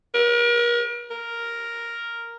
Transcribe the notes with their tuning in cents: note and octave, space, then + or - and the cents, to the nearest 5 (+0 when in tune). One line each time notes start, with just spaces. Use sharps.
A#4 +40
A#4 +0